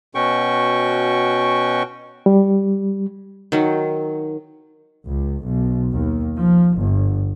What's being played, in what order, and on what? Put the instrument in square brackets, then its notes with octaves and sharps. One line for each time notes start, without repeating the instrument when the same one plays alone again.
[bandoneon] B2 C#4 F#4 G5 C#6
[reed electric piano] G3
[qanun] D#3 F#3
[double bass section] C#2
B1
D#2
F3
G1